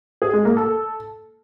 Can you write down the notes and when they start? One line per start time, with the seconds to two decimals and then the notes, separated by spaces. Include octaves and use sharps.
0.22 G#4
0.33 G#3
0.45 A#3
0.57 A4